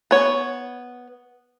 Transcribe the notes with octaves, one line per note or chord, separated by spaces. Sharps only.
B3 C#5